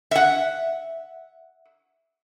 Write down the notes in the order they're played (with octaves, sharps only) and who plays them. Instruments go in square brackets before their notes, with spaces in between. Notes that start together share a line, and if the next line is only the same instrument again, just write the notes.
[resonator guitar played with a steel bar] E5 F#5